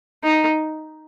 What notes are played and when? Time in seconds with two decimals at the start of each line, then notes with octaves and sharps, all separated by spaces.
0.24 D#4